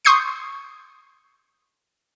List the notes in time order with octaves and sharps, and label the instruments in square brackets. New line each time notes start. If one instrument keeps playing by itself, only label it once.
[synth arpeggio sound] C6 C#6 D#6 G6 C7 C#7